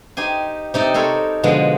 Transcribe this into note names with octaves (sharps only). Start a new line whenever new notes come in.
D#4 G4 C5 G#5
C3 D#4 D5
A4 A#4 C5 C#5 B5
B2 D3 F3 G#3